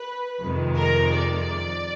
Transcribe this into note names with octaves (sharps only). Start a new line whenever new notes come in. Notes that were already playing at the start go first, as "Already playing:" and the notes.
Already playing: B4
F2 C3 D#3 G#3
A#4
D5